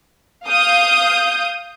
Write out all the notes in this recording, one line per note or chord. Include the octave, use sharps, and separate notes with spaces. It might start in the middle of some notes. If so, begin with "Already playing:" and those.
F5 D#6 G6